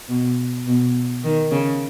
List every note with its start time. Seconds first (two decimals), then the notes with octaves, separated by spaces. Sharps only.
0.09 B2
0.67 B2
1.24 D#3
1.52 C#3